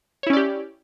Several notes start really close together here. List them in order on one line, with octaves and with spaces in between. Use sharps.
C#5 E4 C#4 D5 G4